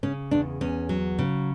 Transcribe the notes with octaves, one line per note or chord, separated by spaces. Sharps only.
C#3 C#4
E2 D4
E2 C#4
F#3
C#3